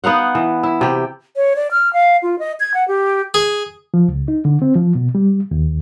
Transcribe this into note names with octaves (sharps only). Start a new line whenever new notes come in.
B3 D#4 F5 F#5
E3
E4
C3 G4
C#5
D5
F6
F5
F4
D#5
G#6
F#5
G4
G#4
F3
C#2
D#4
D3
C4
F3
B2
G3
D#2